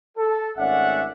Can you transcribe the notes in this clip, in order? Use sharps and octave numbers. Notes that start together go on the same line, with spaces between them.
A4
G#1 A3 C#4 D5 E5 F#5